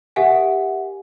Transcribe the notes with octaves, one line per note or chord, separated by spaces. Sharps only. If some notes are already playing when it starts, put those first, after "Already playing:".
G4 A#4 E5 F#5 G#5